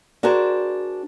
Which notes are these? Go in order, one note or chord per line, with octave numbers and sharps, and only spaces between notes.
D4 F#4 G#4 A#4 C5